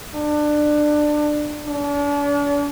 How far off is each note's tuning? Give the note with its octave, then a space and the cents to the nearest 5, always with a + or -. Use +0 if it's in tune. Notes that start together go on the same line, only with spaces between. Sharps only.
D4 +20
D4 -40